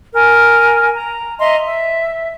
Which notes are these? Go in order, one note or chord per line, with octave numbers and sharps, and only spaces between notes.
A#4 G#5
A#5
D#5 E5 A#5 C6
E5